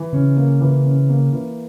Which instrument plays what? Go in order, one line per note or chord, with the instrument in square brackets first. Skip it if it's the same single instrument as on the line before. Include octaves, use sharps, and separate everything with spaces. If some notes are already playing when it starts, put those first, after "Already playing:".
Already playing: [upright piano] E3
[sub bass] C#3 [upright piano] C#4
[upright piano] A#3
E3
C#4
A#3
E3